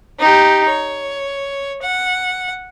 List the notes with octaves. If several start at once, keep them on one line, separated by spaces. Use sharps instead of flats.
D#4 G4
C#5
F#5